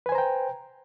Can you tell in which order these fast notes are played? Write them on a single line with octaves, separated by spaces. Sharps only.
B4 G#5 C5 A#5 G5